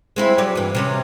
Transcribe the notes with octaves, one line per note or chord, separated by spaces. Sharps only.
G#3 C4 E4
F#3 G3 D5
G2 E3
C3 G3 C#4